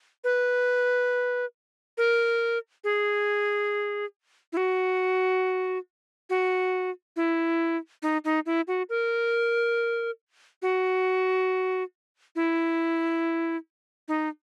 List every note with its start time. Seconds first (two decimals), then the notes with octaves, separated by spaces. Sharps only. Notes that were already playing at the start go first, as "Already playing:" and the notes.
0.24 B4
1.98 A#4
2.84 G#4
4.53 E4
4.57 F#4
6.30 F#4
7.16 E4
8.03 D#4
8.25 D#4
8.46 E4
8.68 F#4
8.89 A#4
10.62 F#4
12.36 E4
14.08 D#4